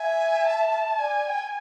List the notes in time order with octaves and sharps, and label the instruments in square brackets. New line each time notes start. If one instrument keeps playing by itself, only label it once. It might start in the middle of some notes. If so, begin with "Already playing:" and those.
Already playing: [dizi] E5 [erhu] G#5
[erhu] A5
[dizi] D5 [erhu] G#5
[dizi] G5